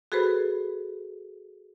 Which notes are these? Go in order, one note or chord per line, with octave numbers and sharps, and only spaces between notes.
F#4 G#4 A4 B4 C5 B5